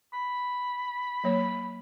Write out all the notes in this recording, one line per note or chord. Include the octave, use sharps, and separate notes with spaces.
B5
F#3 A#3 C#5